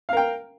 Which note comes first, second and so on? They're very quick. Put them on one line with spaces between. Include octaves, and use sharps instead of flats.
F5 A#4 G5